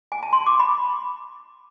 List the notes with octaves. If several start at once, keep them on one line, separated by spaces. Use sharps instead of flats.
G#5
A5
C6
D6
B5